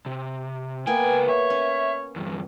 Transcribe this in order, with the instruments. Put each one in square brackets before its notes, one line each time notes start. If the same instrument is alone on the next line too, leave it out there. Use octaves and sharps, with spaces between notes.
[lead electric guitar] C3
[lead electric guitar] C#2 G5 [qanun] A#3 B3 [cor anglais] G#5
[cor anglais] C#5 [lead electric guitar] E5
[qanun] C#4
[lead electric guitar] E2 G2